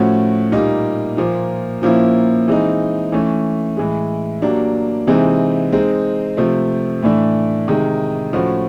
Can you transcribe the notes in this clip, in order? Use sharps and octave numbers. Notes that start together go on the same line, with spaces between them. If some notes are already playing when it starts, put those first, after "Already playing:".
Already playing: A2 F3 A3 C#4 F#4
A#2 G3 A#3 D#4
A#2 F3 A#3
A#2 F3 A#3 C#4 E4
E3 G#3 C4 D#4
E3 A3 C#4
A2 E3 G#3
F#3 A#3 D4 G4
C3 E3 G#3 C4 D#4
G#3 C4 D#4
C3 F3 A3
A2 E3 A3 D4
C3 D#3 G#3
A2 F3 A3 C#4 F#4